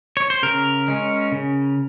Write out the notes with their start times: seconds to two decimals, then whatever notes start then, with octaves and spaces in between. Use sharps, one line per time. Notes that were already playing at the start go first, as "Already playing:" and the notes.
0.17 C#5
0.30 C5
0.43 C#3 A#4
0.88 G#3 C#4
1.32 C#3